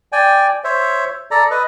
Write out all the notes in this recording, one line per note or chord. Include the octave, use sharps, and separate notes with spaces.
D5 G5 G#5
C5 C#5 E5
A4 D5 A#5
B4 D#5